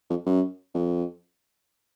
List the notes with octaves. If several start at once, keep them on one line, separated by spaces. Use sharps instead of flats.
F2
F#2
F2